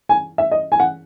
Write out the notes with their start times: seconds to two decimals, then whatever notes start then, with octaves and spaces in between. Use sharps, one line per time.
0.09 G#5
0.38 E5
0.52 D#5
0.72 G#5
0.80 F#5